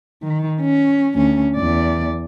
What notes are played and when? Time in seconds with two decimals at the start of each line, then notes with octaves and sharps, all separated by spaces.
0.23 D#3
0.60 C#4
1.15 D2 C#4
1.55 E2 D5